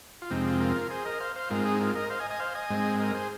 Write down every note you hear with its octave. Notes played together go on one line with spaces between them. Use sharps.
F4
F2 C3 G#3 C4 D#4
F4
F4 A#4
G#4 C5
A#4 D#5
C5 F5
C5 F5
G#2 G#3 C4 F4 A#4
D#4 G#4
F4 A#4
A#4 D#5
C5 F5
D#5 G#5
D#5 G#5
C5 F5
D#5 G#5
G#2 G#3 C4
A#4 D#5
G#4 C5